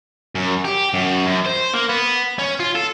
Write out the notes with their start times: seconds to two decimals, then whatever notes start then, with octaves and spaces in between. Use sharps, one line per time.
0.35 F#2
0.65 G4
0.94 F#2
1.27 F#2
1.46 C5
1.74 A#3
1.89 B3
2.39 C#4
2.60 F4
2.75 A4